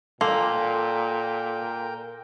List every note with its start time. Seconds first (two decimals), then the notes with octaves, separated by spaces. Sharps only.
0.21 A#2 A#3 A4 A#4 G5 C6